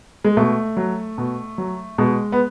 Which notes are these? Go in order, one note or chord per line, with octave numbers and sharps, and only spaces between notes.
G#3
B2 A3
F#3
B2
F#3
B2 G#3
B3